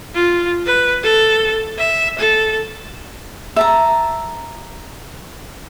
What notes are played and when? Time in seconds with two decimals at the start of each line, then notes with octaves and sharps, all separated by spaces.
0.15 F4
0.66 B4
1.03 A4
1.78 E5
2.19 A4
3.56 E5 A5 A#5